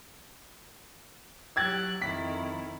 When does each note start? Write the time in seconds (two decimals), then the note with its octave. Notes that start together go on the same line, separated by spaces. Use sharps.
1.56 F#3 G4 E6 F#6 G#6 A6
2.02 F2 D#3 E4 B6